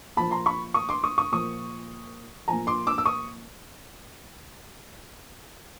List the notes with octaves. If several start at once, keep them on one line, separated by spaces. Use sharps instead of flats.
A#2 F3 A5 B5
A#5 C6
B5 C#6
C#6 D#6
C6 D6
C#6 D#6
C#6 D#6
A#2 F3 C#6 D#6
A#2 F3 G#5 A#5
C6 D6
D6 E6
E6
C#6 D#6